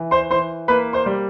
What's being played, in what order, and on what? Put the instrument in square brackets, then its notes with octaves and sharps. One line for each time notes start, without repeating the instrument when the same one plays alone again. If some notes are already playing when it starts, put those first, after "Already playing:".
Already playing: [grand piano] E3
C5 C6
E3 C5 C6
A#3 B4 B5
C5 C6
G3